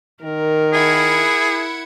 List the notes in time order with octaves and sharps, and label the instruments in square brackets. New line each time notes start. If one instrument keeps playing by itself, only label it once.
[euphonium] D#3 [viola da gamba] A#4
[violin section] E4 F#5 G#6 [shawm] G#4